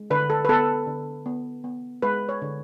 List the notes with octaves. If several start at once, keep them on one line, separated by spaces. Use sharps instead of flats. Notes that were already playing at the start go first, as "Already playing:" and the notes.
Already playing: G#3
D3 B4
A4
B4
B3 A4
D3
B3
B3
G#3 B4
C#5
D3